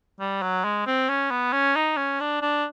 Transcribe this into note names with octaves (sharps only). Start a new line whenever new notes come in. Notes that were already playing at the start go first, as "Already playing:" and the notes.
G3
F#3
G#3
C4
C#4
B3
C#4
D#4
C#4
D4
D4